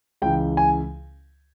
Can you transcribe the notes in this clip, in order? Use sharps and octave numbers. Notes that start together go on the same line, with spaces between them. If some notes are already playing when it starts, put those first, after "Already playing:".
C#2 C#3 E3 G5
G#5